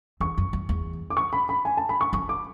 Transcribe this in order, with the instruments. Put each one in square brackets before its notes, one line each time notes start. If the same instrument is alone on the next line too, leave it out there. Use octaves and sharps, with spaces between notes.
[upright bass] E2 [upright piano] C#6
[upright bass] F#2
F#2
E2
[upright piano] D6
C#6
B5
B5
G#5
A5
B5
C#6
[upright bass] F#2 [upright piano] C#6
[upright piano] D6